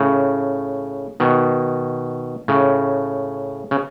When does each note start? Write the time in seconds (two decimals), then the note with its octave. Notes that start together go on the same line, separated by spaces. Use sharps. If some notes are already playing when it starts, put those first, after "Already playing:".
Already playing: A2 C#3
1.20 B2 D#3
2.48 A2 C#3
3.71 C#3